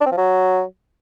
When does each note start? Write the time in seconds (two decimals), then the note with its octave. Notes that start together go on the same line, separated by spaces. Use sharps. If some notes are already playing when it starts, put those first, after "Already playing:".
0.01 D4
0.06 C4
0.12 F3
0.17 F#3